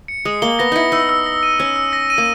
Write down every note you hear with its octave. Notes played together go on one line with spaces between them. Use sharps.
C#7
G#3 D#6
A#3 G7
B3 A#6
D#4 E4 C#7
D#4 E6
E6
A#6
D#7
C#4 E6
E6
A#6
D#7
A#3